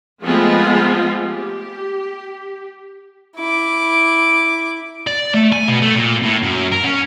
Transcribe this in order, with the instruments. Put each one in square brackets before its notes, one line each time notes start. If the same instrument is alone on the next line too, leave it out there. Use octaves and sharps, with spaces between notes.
[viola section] F3 G#3 A3 B3 C4 F4
G4
[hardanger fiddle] E4 D6
[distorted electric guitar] D5
A3
G#5
B2
A3
A#2
A2
F#2
A#4
C#4